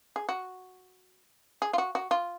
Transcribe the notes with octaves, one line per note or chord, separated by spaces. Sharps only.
G#4
F#4
G#4
F4
F#4
F#4
F4